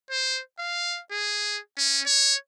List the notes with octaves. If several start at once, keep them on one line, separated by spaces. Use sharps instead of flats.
C5
F5
G#4
C#4
C#5